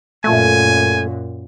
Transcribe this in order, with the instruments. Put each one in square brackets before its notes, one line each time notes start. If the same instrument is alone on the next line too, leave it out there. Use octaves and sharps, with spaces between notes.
[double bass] F#2 A#2 [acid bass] A3 [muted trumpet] G#5